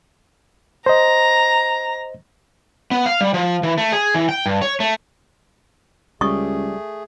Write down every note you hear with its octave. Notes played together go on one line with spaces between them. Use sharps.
C5 D#5 A#5
B3
F5
G3
F3
E3
A3
G#4
E3
G5
G2
C#5
A3
C#2 G3 A3 G#4 C#6 D#6